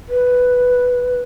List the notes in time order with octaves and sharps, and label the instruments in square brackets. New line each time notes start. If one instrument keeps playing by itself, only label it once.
[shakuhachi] B4